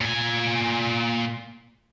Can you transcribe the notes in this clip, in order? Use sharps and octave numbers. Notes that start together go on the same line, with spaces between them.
A#2 G#5